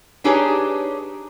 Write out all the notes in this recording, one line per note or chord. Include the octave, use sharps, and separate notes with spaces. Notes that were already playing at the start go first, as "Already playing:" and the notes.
D4 D#4 G4 G#4 B4 C#5